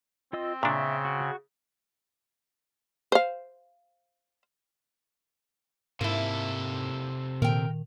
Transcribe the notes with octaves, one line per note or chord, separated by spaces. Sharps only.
C4 F4 D#5 E6
A#2 C#3 D4 E5 C#6 E6
F#4
C5 F5
G#2 C3 A#3 E4 A4
A#2 D#3 A#4 G5